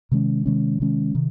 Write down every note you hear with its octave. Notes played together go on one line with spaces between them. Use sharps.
C3 D#3 G#3 C#4
C3 D#3 G#3 C#4
C3 D#3 G#3 C#4
C3 D#3